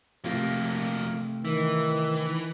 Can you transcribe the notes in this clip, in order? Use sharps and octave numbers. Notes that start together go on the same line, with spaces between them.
F2 C3 A3 A#3 F4
D#3 E3